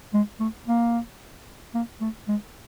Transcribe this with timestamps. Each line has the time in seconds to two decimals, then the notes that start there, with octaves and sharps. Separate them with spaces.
0.14 G#3
0.40 A3
0.67 A#3
1.74 A#3
2.01 A3
2.28 G#3